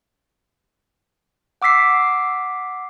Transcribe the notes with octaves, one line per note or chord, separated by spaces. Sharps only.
F#5 D6 E6 B6 C7